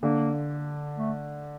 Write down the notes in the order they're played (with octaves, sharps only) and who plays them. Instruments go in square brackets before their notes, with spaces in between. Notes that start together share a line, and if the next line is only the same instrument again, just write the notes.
[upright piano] D3 [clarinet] A#3
[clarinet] A3